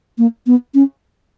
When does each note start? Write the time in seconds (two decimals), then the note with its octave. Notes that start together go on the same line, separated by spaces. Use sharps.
0.18 A#3
0.47 B3
0.74 C#4